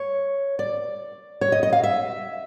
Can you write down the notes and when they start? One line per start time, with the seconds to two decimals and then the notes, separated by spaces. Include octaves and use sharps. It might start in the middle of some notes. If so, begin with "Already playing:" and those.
Already playing: C#5
0.59 D5
1.41 C#5
1.52 D#5
1.63 D#5
1.73 F5
1.83 E5